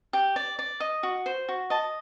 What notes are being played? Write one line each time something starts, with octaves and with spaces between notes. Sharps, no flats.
G4
D5
D5
D#5
F#4
C5
F#4
D#5 A5